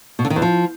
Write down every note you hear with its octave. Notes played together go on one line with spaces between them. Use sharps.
B2
D3
D#3
E2
F3